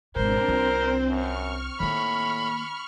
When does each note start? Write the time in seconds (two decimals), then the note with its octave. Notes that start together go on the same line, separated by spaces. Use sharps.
0.16 G#1 B2 C4 D4 A#4 C5
0.48 C2 C4 F4
1.08 F#2 C#6 F6
1.80 A2 D#3 A#3 B5